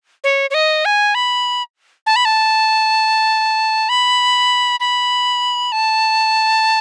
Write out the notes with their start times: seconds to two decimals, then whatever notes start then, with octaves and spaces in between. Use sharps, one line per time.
0.24 C#5
0.50 C#5
0.54 D#5
0.85 G#5
1.15 B5
2.06 A5
2.16 B5
2.25 A5
3.89 B5
4.80 B5
5.72 A5